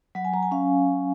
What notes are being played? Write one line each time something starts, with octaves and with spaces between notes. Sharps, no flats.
F#3 F#5
G#5
F#3 A#5
G#5
C#4 F5